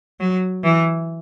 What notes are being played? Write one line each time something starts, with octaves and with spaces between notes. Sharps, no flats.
F#3
E3